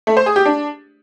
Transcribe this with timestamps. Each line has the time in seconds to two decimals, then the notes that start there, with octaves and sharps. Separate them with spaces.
0.07 A3
0.17 C5
0.26 G#4
0.36 G4
0.45 D4